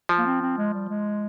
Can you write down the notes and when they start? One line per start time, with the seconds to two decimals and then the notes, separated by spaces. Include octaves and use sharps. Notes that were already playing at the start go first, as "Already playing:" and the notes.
0.09 F3
0.18 A#3
0.26 C4
0.42 C4
0.58 G#3
0.74 G3
0.89 G#3